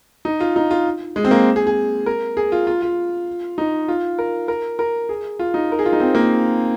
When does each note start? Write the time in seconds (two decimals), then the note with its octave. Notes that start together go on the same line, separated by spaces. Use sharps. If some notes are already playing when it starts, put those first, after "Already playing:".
0.25 D#4
0.40 F4
0.56 D#4
0.71 F4
1.16 G#3
1.25 C4
1.31 A#3
1.56 G#4
1.67 G#4
2.06 A#4
2.37 G#4
2.52 F4
2.67 F4
2.82 F4
3.58 D#4
3.88 F4
4.19 A#4
4.48 A#4
4.79 A#4
5.09 G#4
5.39 F4
5.54 D#4
5.72 A#4
5.79 G#4
5.85 F4
5.93 D#4
6.00 C4
6.15 A#3